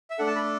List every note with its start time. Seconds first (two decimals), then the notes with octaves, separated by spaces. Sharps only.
0.10 E5
0.19 A3 D4 A4 F#5
0.27 A5
0.36 B5